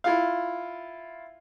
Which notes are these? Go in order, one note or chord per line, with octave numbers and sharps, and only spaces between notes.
E4 F4 F5